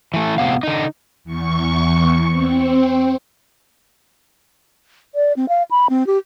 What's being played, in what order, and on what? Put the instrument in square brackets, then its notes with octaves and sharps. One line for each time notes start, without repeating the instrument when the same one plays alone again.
[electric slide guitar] E3 A3
A2 C3 B3 F5
D3 D#4
[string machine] E2 C#6
C4
[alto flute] D5
C4
F5
B5
C4
G4